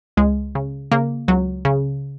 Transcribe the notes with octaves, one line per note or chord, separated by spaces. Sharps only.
C#2 G#3
C#3
C#3 A#3
C#2 F#3
C#3